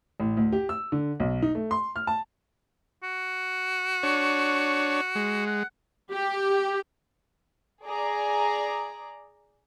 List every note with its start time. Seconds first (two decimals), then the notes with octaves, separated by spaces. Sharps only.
0.20 A1
0.37 D2
0.52 G4
0.69 E6
0.92 D3
1.20 B1
1.42 D#4
1.55 A3
1.71 C6
1.96 F6
2.07 A5
3.03 F#4
4.03 D4 C#5
5.15 G#3
5.46 F#5
6.12 G4
7.83 G#4 D5 A#5